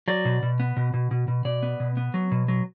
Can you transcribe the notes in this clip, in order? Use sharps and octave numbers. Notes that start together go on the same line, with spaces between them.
F#3 D5
B2
B2
B3
B2
B2
B2
B2
B2 D5
B3
B2
B3
F#3
B2
F#3